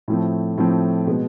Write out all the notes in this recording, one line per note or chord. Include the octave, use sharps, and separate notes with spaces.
A2 F3 A3 C4
A2 F3 A3 C4
B2 G#3